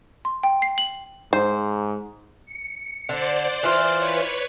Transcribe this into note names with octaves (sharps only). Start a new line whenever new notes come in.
C6
G5
C7
F#7
G#2 C5
C#7
D3 C5 D5
E3 F4
B4 C#5